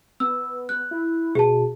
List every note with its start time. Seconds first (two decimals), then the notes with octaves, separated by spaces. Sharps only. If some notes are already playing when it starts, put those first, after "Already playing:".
0.20 B3 E6
0.69 F#6
0.91 E4
1.35 B2 G#4 A5